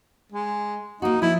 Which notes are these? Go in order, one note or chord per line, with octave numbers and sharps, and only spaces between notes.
G#3
A#3 D#4 F#4
F3 E4